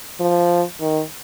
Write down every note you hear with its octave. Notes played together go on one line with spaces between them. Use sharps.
F3
D#3